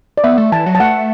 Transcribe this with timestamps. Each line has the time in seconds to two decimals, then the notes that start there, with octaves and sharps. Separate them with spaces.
0.17 D5
0.24 B3 E5
0.38 A3
0.52 E3 A5
0.66 F#3
0.75 A5
0.80 A3 F#5